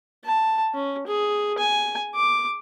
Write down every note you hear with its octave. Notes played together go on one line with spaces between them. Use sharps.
A5
C#4
G#4
G#5
D6